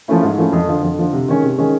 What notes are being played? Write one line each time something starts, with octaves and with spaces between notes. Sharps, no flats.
F3 A3 C#4 E4
G#2
F3 A3 C#4 E4
F2
D3 F3
F2
D3 F3
C3
D#3 G#3 C#4
C3
D#3 G#3 C#4